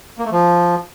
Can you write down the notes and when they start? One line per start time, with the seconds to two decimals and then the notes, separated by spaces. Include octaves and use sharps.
0.19 A#3
0.25 A3
0.31 F3